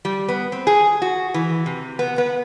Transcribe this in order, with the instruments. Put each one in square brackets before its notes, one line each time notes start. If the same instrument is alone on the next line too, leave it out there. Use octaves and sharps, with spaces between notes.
[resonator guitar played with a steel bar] G3
B3
C4
G#4
F#4
E3
C3
B3
B3